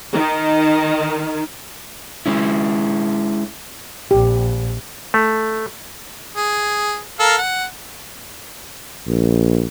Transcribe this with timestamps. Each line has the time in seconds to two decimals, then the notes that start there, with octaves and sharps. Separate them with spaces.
0.14 D#3
2.26 G#3 C#4 E4
4.11 A#1 G4
5.14 A3
6.37 G#4
7.20 A4 A#4 F5
7.38 F#5
9.07 A#1